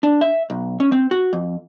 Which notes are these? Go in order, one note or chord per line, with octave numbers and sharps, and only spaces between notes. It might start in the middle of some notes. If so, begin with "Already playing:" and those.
D4
E5
B1
C#4
C4
F#4
F2